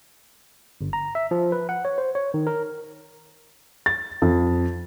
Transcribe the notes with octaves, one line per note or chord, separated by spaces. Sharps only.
G1
A#5
E5
F3
B4
F#5
C#5
C5
C#5
D#3
A#4
A6
F2